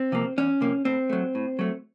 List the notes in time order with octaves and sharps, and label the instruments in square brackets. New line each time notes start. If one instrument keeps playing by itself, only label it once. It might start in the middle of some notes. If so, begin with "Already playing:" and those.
Already playing: [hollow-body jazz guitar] C4
C3 F3 A#3
E2 C#4
C3 F3 A#3
A2 C4
F#3 A3
A2
F#3 A3